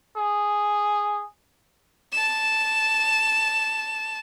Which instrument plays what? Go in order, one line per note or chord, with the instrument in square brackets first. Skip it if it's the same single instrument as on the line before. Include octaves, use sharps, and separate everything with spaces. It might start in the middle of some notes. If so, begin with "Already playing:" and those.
[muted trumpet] G#4
[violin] A5 E7